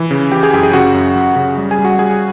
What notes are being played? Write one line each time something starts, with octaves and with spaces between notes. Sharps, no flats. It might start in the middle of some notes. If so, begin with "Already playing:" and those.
Already playing: E3
C#3
E3 G4 G5
G#4 G#5
F#2 G4 G5
G#4 G#5
C#3 F#4 F#5
F#2
F#2
C#3
G3
G#4 G#5
G3
F#4 F#5
G3 G#4 G#5